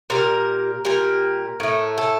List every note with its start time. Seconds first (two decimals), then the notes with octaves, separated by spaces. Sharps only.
0.10 A#2 G3 A#4
0.85 A#2 G3 A#4
1.60 A2 A3
1.98 A4